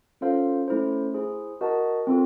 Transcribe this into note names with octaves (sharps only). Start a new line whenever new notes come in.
C#4 F4 A4 C5 F5
A3 C#4 E4 A4 C5
E4 G#4 C5
F#4 A#4 D#5 F#5 A5
C4 F4 A4